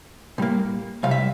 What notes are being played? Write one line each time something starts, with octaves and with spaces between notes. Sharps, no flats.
A2 G3 A#3
C2 C3 G3 F5
E5